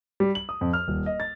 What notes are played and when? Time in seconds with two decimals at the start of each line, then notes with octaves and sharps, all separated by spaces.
0.20 G3
0.35 F#7
0.49 D#6
0.61 F2
0.73 F6
0.88 D#1
1.06 D#5
1.20 A6